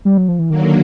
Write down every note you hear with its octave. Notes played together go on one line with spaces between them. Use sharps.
G3
F#3
F3
E3
D3 D#3 F#3 A#3